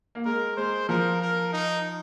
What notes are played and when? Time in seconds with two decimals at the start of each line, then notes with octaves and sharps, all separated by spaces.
0.15 A#3
0.25 G#3 A#4
0.57 G#3 C5
0.89 F3 A#4
1.22 A#4
1.53 D#4